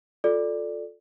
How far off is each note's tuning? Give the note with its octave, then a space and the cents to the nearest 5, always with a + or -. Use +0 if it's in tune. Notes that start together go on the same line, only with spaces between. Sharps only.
F4 +30 A4 +0 D5 +0